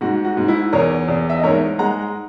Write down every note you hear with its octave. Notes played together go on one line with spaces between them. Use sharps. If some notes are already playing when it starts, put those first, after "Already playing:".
G#2 F#4
F#4
G#2
E4
E2 A#4 C#5
E2
E5
D#5
G#2 A#4 C#5
G#3 F#5 A#5